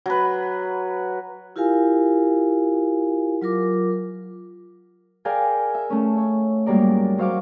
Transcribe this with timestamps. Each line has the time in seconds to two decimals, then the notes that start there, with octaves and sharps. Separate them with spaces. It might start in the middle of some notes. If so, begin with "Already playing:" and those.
0.06 F#3 B4
1.56 E4 F4 G4 A#4 F5 G#5
3.42 F#3 F4 A#4 D6
5.25 G#4 A#4 D5 F5 G5 G#5
5.74 E5
5.90 A3 C#4
6.17 C#5
6.66 G#2 F#3 G3 A#3 A#4 D5
7.18 F#3 C5 E5 F5 C#6 D6